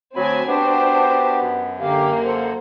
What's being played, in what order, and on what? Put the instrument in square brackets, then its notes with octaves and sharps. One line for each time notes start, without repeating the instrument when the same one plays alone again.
[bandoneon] D2 B5 [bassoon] F#3 [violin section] C4 G#5
[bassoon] B3 [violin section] D4 C5 [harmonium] F#4 [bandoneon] G4
[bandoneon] F#2
[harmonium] D3 G4 F5 [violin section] A#3
[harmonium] A4 C5 F#5